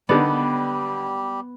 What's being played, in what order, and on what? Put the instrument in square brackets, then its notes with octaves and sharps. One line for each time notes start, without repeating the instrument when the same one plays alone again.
[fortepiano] D3 D#4 D5 [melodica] G3 G4 [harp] B3